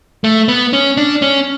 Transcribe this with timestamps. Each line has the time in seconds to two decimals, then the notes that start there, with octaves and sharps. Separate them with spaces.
0.24 A3
0.48 B3
0.73 C#4
0.97 D4
1.22 C#4